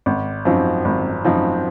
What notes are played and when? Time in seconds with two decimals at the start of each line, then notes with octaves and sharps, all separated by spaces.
0.06 G#1
0.45 F#2 F3 C4 D#4
0.85 G#1
1.25 F#2 F3 C4 D#4